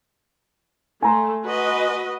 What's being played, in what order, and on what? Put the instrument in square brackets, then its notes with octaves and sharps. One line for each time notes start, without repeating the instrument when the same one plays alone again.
[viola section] A3 [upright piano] G#5 A#5 C6
[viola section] F#4 B4 D#5